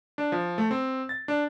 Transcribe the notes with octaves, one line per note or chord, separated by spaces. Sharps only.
D4
F3
A3
C4
A6
D4